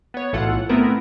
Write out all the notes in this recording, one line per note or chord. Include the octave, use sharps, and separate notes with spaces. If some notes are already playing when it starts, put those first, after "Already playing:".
B3 C#5
B1 A2 E3 F4 A4 F#5
A3 B3 C4 E4 A#4 B4